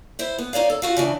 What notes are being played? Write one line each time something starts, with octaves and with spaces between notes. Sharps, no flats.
E4 C5
B3
D#4 C#5 D5 F5
A4
F4 F#4 F5
C#3 E3 D4